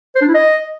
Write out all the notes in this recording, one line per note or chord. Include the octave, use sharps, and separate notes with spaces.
C5
D4
E4
D#5